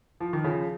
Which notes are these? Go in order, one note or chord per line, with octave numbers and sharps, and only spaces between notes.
F3
D#3
C#3 F3